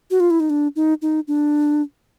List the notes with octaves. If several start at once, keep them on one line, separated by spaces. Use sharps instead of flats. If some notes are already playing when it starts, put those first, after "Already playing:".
F#4
F4
E4
D#4
D4
D#4
D#4
D4